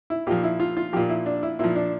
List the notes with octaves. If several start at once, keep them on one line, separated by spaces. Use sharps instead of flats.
E4
A#2 F3 G4
E4
F4
F4
A#2 F3 G4
E4
D4
E4
A#2 F3 E4
D4